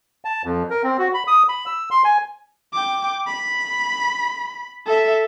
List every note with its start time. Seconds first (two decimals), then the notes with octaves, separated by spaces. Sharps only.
0.25 A5
0.45 F2
0.70 A#4
0.83 C4
0.99 F#4
1.14 B5
1.27 D#6
1.48 B5
1.66 E6
1.91 C6
2.05 G#5
2.73 G5 D6
3.27 B5
4.86 A4 E5